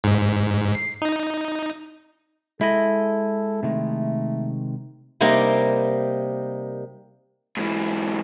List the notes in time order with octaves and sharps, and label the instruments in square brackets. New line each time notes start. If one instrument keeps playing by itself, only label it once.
[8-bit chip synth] G#2
C7
D#4
[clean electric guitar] G#3 D#5 [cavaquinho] E4 [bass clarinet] A4
[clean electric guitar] C3 D#3 G#3 [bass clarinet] A3
[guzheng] C3 G3 A#3 D#4 G4 A#4
[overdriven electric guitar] G#2 E3